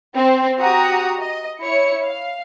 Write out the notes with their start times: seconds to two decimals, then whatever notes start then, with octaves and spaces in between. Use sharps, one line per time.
0.16 C4
0.59 F#4 G4 F#5 A#5 D#6
1.18 D#5
1.61 E4 C#5 C#7
2.04 F5